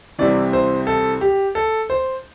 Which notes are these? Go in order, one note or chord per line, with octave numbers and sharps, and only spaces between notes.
C2 C3 E3 D5
C5
A4
G4
A4
C5